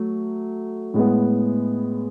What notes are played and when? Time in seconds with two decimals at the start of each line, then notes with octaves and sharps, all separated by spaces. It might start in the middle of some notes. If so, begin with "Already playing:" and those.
Already playing: F#3 A3
0.94 A2 G#3 B3